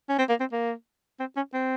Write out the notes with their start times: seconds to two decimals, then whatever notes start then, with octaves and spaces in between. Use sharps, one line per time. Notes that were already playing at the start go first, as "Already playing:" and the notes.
0.09 C#4
0.19 C4
0.29 A#3
0.40 C4
0.52 A#3
1.20 C4
1.36 C#4
1.54 C4